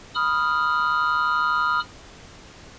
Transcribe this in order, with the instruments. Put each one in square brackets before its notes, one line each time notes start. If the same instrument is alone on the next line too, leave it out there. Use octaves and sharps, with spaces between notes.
[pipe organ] B5 D#6 F6